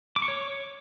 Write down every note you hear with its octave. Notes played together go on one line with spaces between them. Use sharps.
D6
C#6
C#5